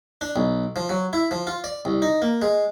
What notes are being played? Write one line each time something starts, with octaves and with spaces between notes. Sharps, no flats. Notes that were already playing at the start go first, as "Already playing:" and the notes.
D4
B1
F3
F#3
E4
F3
F4
D5
C2
D#4
A#3
G#3